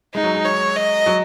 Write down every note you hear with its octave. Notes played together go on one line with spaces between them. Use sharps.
G#3 D#4
F#3
G#3
C#5
D#5
F#3